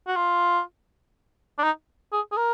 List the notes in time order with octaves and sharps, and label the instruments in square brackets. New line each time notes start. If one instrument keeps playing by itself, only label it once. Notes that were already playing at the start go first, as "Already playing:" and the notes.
[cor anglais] F#4
F4
D4
D#4
G#4
G#4
A#4